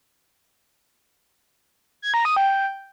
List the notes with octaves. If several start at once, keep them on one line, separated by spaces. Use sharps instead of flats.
G#6
A#5
D#6
G5